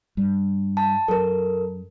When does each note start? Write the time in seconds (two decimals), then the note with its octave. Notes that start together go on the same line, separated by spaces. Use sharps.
0.17 G2
0.77 A5
1.08 F#2 A4 A#4